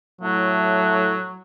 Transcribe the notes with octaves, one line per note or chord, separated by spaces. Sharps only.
A2 F#3 A3